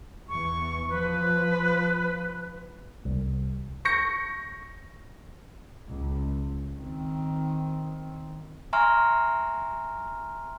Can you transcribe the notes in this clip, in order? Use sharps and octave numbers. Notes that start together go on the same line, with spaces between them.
E2 E3 C#6
F3 B4
C2
C#6 G6 A#6 C#7
C#2
D#3 C4
E5 G#5 A#5 C6 C#6 F6